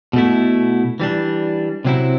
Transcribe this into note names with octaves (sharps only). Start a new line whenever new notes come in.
B2 A3 E4
E3 G3 D4
C3 F#3 C4 E4